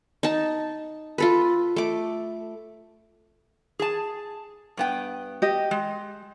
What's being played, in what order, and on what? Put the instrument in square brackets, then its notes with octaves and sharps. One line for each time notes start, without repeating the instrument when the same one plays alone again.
[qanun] D#4 A5
F4 A4 B4
A3 D6
[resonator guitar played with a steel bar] G#4 A5
G2 B3 G5
[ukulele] G4 D#5
[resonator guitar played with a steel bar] G#3